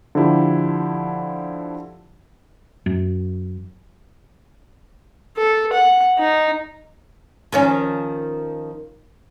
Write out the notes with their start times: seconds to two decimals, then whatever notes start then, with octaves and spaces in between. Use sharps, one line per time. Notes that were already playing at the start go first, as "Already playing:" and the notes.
0.15 D3 F3 E4 G4
2.86 F#2
5.37 A4
5.73 F#5
6.19 D#4
7.52 D#3 F3 C#4